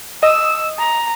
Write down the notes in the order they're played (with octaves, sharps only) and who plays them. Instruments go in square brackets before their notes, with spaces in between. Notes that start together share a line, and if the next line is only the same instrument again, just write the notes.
[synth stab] D#5 D#6 [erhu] E6
[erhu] A#5